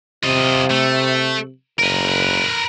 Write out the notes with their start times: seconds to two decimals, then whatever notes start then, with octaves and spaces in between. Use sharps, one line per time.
0.24 C3 F4 D#5
0.71 A3
1.79 F#1 A#4 B4